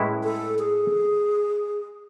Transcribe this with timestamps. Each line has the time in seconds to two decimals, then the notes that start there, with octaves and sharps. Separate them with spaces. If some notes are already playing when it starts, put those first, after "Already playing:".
Already playing: A2 G#3 C#4 E4 B4
0.23 A4
0.59 G#4